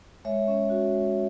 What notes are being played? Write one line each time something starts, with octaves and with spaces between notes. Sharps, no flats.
G#3 C#5 E5
C#4
F#4
G#3